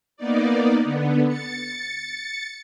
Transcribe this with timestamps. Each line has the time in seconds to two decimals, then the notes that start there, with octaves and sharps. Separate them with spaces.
0.17 A#3 B3 D#4 D5
0.84 D3 B3
1.27 A6 C#7